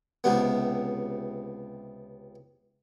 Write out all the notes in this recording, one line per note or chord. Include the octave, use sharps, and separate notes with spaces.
C#2 C3 B3